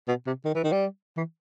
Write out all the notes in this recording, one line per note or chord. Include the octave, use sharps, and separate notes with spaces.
B2
C3
D#3
E3
D#3
G3
E3